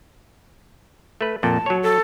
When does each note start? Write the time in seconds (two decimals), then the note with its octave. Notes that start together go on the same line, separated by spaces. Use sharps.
1.21 A3 B4
1.43 F2 A#2 A5
1.66 F#3 C#5
1.83 A4